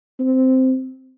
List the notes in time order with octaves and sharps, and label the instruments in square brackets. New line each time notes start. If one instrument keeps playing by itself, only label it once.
[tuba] C4